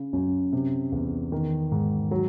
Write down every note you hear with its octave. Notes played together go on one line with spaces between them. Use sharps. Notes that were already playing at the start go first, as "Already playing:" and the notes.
Already playing: C#3
F#2
C3
E2
D#3
G#2
F#3